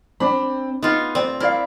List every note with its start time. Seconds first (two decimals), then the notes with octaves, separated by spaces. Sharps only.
0.20 C4 D4 B5
0.82 B3 D#4 F4 G#4
1.15 D2 C4 D5
1.40 E4 A#4 D5 F5